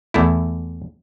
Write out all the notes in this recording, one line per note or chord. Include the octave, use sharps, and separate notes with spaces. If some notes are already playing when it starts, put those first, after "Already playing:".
E2 A3 E4